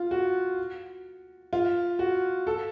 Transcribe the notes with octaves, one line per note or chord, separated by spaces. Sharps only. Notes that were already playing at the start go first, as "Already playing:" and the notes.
Already playing: F4
F#4
F4
F#4
A4